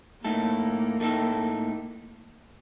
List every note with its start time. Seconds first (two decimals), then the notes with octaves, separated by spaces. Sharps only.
0.24 A2 A3 A#3 D#4 A4
1.00 A2 A3 D#4 A4